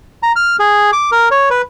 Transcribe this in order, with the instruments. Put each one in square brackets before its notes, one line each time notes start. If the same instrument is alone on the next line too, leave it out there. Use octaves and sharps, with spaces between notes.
[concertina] A#5
F6
G#4
D6
A#4
C#5
B4